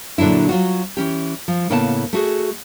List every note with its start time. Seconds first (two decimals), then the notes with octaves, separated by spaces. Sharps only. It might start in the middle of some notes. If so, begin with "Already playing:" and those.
0.18 A#2 D3 F#3 D4 E4
0.49 F#3 F4 F#4
0.97 E3 C#4 G4
1.48 F3
1.70 A2 C#3 A#3 B3 F#5 A5
2.13 A3 F#4 G#4